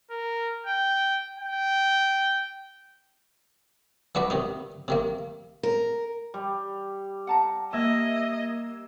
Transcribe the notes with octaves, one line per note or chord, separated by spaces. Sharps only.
A#4
G5
G5
E3 D4 F#4 B4 D5
C3 D#3 D#4
C3 D#3 A#3
A#4
G3
F#5 A5 A#5
A#3 D#5 E5 G#6 E7